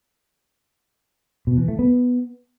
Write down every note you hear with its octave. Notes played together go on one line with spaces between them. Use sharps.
B2
E3
A3
B3